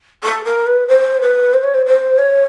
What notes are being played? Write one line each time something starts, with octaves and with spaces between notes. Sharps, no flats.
A4
A#4
B4
C5
B4
C5
C#5
C5
C5
C#5